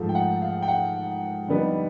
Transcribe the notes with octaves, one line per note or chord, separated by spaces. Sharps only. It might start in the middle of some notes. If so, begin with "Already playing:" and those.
Already playing: G#2 F3 A3
G5
F#5
F5
G5
F#5
F2 D3 G3 B3 D#4